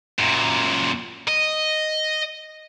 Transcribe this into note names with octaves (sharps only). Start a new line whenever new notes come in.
F#2 A#2
D#5